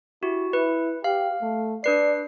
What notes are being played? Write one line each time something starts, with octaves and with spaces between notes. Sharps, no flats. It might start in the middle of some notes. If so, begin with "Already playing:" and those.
E4 F#4 G4
E4 B4
G4 F5
A3
D4 B4 D5 C7